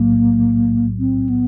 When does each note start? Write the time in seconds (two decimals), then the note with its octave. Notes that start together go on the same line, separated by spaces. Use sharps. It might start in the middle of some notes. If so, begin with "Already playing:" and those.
Already playing: B1 A2 F#3 A#3
0.99 C4
1.29 B3